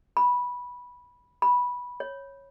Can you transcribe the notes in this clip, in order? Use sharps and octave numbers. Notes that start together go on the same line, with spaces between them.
B5
B5
C#5